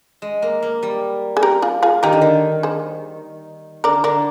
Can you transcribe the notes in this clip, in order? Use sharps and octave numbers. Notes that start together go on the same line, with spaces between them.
G#3
A#3
A#3
G3
G#4
G4 A#4
F4 G#4
F4 G#4
D#3 G4 A#4
D3
D#3
G#4 C5
D3 A#4 D5
D3 A#4 D5